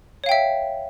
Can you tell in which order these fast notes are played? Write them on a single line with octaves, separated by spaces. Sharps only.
C#5 F5 G5 E5